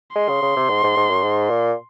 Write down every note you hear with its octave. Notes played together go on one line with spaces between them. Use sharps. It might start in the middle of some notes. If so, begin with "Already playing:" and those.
G#3 C6
C#3
C#3
C3
G#2
G#2
G#2
F#2
G#2
A#2